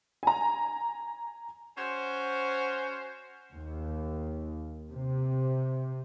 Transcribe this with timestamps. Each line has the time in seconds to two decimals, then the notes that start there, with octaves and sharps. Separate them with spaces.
0.23 G#5 A#5
1.77 C#4 F#4 C5
3.53 D#2
4.92 C3